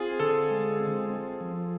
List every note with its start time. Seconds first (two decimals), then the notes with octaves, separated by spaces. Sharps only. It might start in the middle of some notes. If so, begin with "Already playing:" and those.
Already playing: C4 F4 G#4
0.20 D3 A4
0.50 G#3
0.80 C4
1.10 C4
1.41 F3